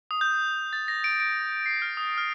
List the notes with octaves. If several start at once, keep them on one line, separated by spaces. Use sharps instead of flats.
D#6
G6
A6
A#6
D7
D7
C7
F6
D#6
F6